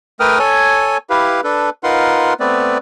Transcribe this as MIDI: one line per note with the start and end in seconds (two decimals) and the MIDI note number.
0.20 0.39 57
0.20 0.39 70
0.20 0.39 71
0.20 0.39 79
0.20 0.39 87
0.20 0.39 89
0.39 0.97 69
0.39 0.97 73
0.39 0.97 80
1.10 1.41 64
1.10 1.41 67
1.10 1.41 71
1.10 1.41 77
1.44 1.70 62
1.44 1.70 69
1.44 1.70 71
1.84 2.34 63
1.84 2.34 65
1.84 2.34 70
1.84 2.34 71
1.84 2.34 78
1.84 2.34 84
2.40 2.78 57
2.40 2.78 59
2.40 2.78 60
2.40 2.78 71
2.40 2.78 74